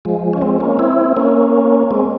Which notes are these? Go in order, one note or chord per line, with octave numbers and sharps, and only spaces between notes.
F3 G#3
C#4
G#3 C4
A#3 C#4
C4 E4
A#3 C#4
G#3 C4